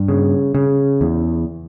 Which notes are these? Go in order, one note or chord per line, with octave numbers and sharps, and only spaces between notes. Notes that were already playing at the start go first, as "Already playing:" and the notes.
Already playing: G2
C#3
C#3
E2